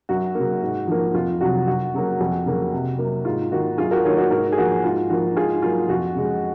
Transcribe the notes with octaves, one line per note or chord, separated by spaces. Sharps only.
F#2 F#4
C#3 F#3 A#3
G#2
F3 A#3
F2 F4
C3 F#3 F#4
F#2 F#4
C#3 F#3 A#3
F2
C#3 F#3 A#3
C3
F#3 A#3
G#2 F4
D#3 A#3 F#4
F#2 F4 G#4
F#4 A#4
D#3 F#3 A#3 A#4 C#5
F#4 A#4
G#2 F#4 A#4
G#4
F3 A#3 F#4
G#2 F4
F3 A#3 F#4
G#2 F4 G#4
F#3 A#3 F4
F2 F#4
C#3 G#3